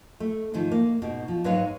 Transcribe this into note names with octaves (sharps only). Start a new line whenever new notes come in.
A3
G#2 D#3 F3
A#3
G#2 B2
F3
G#2 F#3 G#3 B4 C#5 F5